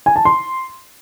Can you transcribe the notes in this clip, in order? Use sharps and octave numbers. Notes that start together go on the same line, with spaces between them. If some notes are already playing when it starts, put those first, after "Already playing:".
G#5
A5
C6